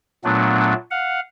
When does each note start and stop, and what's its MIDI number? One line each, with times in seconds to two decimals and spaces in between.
0.24 0.74 46
0.24 0.74 54
0.24 0.74 57
0.24 0.74 59
0.24 0.74 62
0.91 1.20 77
0.91 1.20 78